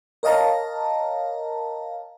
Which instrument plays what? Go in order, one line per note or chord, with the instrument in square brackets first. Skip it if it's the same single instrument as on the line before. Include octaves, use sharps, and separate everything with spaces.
[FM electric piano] A#4 C#5 D#5 F5 A5 A#5